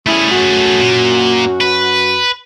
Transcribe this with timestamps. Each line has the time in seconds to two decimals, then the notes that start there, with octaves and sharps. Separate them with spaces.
0.06 G3 A3 C#4 E4 G#4
0.32 F#2 F#4
0.80 A#2
1.61 B4